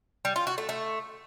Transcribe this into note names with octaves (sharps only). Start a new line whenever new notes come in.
G3
F4
F#4
A3
A3